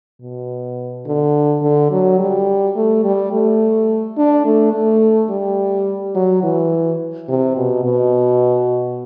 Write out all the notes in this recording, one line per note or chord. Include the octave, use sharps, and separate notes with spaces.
B2
D3
D3
F#3
G3
A3
G3
A3
D4
A3
A3
G3
F#3
E3
C3
B2
B2